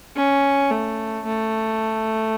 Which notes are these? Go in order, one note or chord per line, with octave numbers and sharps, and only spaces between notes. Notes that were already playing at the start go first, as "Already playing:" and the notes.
C#4
A3
A3